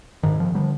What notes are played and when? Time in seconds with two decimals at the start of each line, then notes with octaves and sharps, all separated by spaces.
0.23 G#2 D#3
0.40 F3
0.55 D3 G3